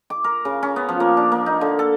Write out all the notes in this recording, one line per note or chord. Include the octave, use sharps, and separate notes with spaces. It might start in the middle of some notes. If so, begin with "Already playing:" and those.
D6
A#4
C#3
C#4
B3
F3
A#3
D4
A#3
D#4
D3
A4